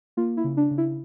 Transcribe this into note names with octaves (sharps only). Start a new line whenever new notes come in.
A#3 F4
E4
C#3
D4
C#3
E4